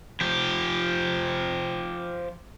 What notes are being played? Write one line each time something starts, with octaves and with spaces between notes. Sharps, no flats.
F3 G4